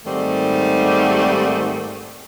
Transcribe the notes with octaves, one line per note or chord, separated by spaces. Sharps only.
G#2 D#3 G3 A3 C4